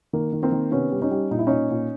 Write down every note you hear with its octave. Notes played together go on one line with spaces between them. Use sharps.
D#3 A#3
D#3
A#3 C4
D#3
C3 B3 C#4
G3
C#4 D#4
G3
A#2 D#4
E4
A#2 C#4 D#4
A#2